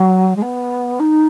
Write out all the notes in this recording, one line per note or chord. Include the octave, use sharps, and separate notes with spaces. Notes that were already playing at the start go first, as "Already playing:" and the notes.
Already playing: F#3
G#3
B3
D#4